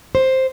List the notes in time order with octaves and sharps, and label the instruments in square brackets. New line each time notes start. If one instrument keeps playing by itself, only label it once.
[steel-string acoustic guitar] C5